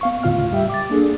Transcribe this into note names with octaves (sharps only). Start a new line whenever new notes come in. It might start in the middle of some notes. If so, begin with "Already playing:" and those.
B3 F5 C#6
D#2 A2 C#3 F4 F5 F6
G3 G4 E5 G5
D6 A6
A#3 D4 G#4 A4